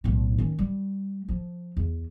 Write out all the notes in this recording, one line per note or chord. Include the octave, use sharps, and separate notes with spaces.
B1 A2
D#3 C#4
G3
F3
E2